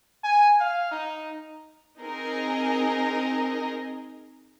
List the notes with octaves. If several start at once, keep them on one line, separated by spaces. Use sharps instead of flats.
G#5
F5
D#4
C4 D#4 G#4 A#4 D#5